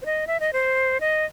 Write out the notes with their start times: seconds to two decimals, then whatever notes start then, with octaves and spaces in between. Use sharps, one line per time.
0.02 C5
0.06 D#5
0.27 E5
0.40 D#5
0.53 C5
1.00 D#5